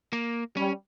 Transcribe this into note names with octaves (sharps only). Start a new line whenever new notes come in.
A#3
G3 C#4